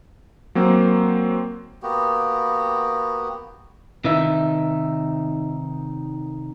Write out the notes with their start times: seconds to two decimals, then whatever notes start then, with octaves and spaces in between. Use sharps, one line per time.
0.55 F#3 A#3 C4
1.83 A#3 B3 F#4 G4
4.04 C3 D#3 D#4 E5